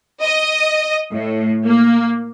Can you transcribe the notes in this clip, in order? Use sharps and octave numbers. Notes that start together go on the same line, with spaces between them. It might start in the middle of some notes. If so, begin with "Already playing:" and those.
D#5
A2
A#3